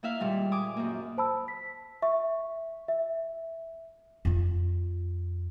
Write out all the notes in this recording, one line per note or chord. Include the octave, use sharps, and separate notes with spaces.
A#3 E4 E5 F5
A#2 D#3 G3 G#3
G#5 D6 D#6
F#2 A#3
C5 A5 B5 E6
B6
E5 C#6
E5
F2 F4